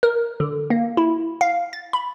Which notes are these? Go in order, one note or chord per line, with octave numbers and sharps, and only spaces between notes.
A#4
D3
A#3
E4
F5
A6
B5